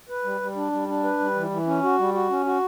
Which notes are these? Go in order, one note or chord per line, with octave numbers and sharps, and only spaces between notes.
B4
G3
G3
D4
G3
D4
B4
G3
E3
E3
C#4
F#4
G3
F#4
C#4
F#4